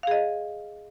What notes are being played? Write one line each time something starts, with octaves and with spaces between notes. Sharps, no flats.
G#4 D#5 F5